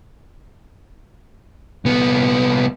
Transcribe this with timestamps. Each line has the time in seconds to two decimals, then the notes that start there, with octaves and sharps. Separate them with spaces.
1.85 C2 B3